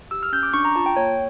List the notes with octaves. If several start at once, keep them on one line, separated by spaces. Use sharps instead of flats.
G4 E6
F6
C#4 G6
D6
D4 C#6
A#5
F4 A5
G5
A#3 C#5